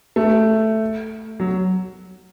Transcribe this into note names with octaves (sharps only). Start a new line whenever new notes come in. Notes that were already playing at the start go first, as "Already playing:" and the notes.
A3
F#3